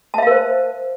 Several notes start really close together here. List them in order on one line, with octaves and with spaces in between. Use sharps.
A5 E5 F5 A#4 C5